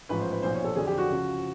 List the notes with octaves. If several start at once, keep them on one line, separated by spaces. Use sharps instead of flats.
A1 G#2 F3 B4
C5
B4
B1 A#2 F3 C5
C#5
A4
F2 D3 F#3 G#4
G4
F#4
C#2 C#3 F3